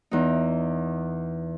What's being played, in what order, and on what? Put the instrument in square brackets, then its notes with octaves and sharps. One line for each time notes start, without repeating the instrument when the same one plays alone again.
[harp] E2 D#4